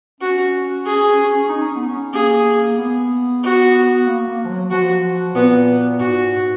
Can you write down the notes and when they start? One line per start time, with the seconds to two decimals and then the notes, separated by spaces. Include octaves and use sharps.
0.21 C#4 F#4
0.85 G#4
1.49 D#4
1.63 C#4
1.76 B3
1.89 C#4
2.13 A#3 G#4
2.78 B3
3.43 F#4
4.06 A#3
4.28 A#3
4.44 F3
4.49 F#3
4.71 F3 F#4
5.34 A#2 B3
5.99 G#2 F#4